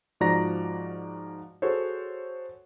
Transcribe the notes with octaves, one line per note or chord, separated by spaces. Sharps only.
G#2 F3 F#4 D5 A#5 A#6
F#4 G#4 A4 C5 C#5